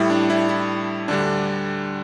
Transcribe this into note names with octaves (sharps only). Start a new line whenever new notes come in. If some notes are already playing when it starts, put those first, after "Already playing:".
Already playing: A2 G3 E4
D4
E4
E4
D2 D3 G3 D4